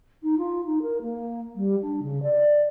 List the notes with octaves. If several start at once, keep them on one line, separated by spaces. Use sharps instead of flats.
D#4
F4
D#4
A#4
A#3
G3
D4
C#3
D5